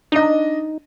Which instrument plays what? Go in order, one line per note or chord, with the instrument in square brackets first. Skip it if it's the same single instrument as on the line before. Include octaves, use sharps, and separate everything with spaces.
[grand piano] D4 D#5 [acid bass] D#4